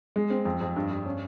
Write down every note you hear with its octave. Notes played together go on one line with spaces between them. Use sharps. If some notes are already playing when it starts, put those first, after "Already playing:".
G#3
C4
F2
F2
G2
G2
C#4